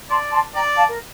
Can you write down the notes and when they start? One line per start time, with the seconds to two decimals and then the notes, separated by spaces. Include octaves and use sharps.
0.10 D5 A5 C6
0.32 A5 C6
0.54 D5 G5 A#5
0.76 F5 A5
0.87 A#4